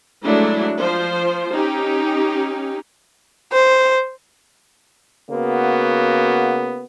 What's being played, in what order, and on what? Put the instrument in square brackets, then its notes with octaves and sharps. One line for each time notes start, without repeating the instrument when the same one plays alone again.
[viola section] F#3 G#3 A3 D4 E4
F3 C5
C#4 D#4 G4
[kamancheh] C5
[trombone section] C#3 A#3 B3 F#4